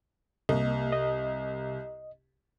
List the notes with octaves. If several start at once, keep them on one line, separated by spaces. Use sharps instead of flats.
C2 A#3 D#5
D#5